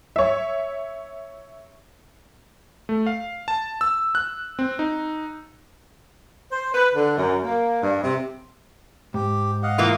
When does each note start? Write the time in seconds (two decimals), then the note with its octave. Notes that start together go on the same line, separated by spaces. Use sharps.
0.16 C#5 E5
2.89 A3
3.07 F5
3.48 A5
3.81 E6
4.15 F#6
4.59 C4
4.79 D#4
6.51 C5
6.74 B4
6.94 D3
7.17 F#2
7.44 A#3
7.82 G2
8.02 C3
9.14 G#2 G4
9.63 D#5 F5 F#5
9.78 E3 A#3 F4